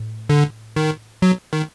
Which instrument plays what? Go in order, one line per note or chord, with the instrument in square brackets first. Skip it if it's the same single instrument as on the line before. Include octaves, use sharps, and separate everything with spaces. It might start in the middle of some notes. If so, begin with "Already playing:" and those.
Already playing: [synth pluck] A2
[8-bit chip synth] D3
D#3
F#3
D#3